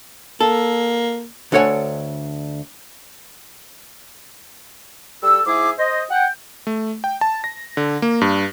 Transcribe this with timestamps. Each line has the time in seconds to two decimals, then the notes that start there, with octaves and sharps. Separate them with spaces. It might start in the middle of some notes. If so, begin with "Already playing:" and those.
0.40 A#3 A4
1.52 D2 D4 A4 C#5 F#5 G#5
5.23 G3 A4 E6
5.45 G#2 E4 G#4 E5 D6
5.78 C5 D#5
6.10 F#5 G5
6.67 A3
7.04 G5
7.21 A5
7.44 A#6
7.77 D3
8.02 A#3
8.21 G2